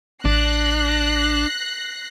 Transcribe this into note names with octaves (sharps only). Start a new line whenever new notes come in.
A1 D4 F#6 A#6 C7